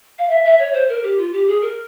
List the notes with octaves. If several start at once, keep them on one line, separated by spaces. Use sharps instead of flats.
F5
E5
E5
C#5
C5
A#4
G4
F4
G4
G#4
A#4